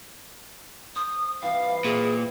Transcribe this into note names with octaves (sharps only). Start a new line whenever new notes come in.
C5 D#6
C3 E3 G3 F5
A#2 G#4